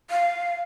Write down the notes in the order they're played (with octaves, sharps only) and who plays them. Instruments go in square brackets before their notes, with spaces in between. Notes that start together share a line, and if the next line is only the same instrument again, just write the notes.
[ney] F5